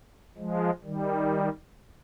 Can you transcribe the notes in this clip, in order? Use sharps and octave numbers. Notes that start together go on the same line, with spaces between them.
F3 G#3
D#3 G3